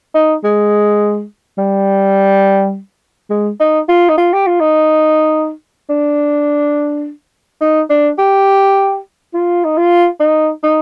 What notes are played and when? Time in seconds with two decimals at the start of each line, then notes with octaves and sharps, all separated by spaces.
0.15 D#4
0.44 G#3
1.58 G3
3.30 G#3
3.60 D#4
3.89 F4
4.09 D#4
4.17 F4
4.33 G4
4.47 F4
4.61 D#4
5.89 D4
7.61 D#4
7.90 D4
8.18 G4
9.34 F4
9.65 D#4
9.78 F4
10.20 D#4
10.64 D#4